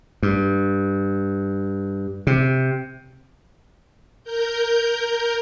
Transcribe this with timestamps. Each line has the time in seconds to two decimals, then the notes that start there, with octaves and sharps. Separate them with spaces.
0.23 G2
2.27 C3
4.24 A#4 G6